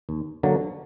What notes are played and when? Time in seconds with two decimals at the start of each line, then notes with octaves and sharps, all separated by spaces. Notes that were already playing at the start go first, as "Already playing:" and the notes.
0.09 D#2
0.43 D3 F#3 A#3